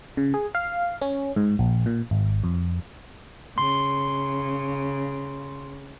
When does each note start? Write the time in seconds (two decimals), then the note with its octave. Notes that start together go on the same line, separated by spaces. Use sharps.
0.17 C#3
0.34 G#4
0.55 F5
1.02 C#4
1.36 G#2
1.59 A#1
1.86 A#2
2.11 G#1
2.44 F2
3.58 C#3 C6